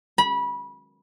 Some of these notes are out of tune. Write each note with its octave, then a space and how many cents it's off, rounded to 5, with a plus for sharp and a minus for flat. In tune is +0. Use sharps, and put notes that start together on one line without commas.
B5 -25